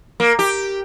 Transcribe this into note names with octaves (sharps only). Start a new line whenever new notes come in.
A#3
G4